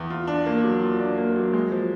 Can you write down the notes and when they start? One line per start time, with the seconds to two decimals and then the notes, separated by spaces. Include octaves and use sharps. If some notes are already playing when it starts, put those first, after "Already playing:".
Already playing: E2
0.10 F4
0.27 D4
0.46 A#3
0.64 F#3
0.82 F4
1.00 D4
1.18 A#3
1.36 F#3
1.53 G#3
1.72 F3